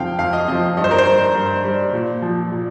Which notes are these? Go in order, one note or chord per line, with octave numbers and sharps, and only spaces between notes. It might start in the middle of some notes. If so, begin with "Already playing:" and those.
Already playing: F2 C3 F3 F5 G5
F2 F5
D#5
C3 F3 D#5
G2 D#5
C5
A#4
C5
G3
G2
G3
A#2
F3
A#2